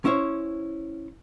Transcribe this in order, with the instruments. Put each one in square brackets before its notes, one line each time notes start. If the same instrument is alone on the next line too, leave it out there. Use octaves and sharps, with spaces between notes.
[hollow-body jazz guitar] C#4 E4 C5 C#5